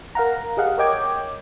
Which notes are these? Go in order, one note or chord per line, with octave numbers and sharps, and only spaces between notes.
A#4 F5 F#5 A#5
G4 G#4 D#5 F5 F#5
A#4 C#5 D#5 G5 D6 G#6